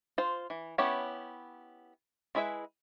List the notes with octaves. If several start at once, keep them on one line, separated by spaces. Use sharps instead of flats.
F4 C5
E3
B3 C#4 E4 G4 C#5
G#3 E4 G#4 B4 E5